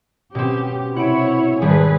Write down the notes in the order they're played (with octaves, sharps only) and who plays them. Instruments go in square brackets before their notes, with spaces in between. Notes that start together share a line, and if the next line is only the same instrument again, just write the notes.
[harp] B2 C4 [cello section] C#4 G4
[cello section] C3 E4 C#5 [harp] F#5 D7
[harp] G#1 G3 [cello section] G#4 B4